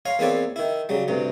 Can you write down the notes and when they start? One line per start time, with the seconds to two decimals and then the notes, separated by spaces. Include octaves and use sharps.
0.05 C#5 F5 A#5 C6
0.19 E2 A#3 C4 B4 C#5 D5
0.56 D#3 E4
0.89 C#3 F#3 G3
1.08 D2 G2 C3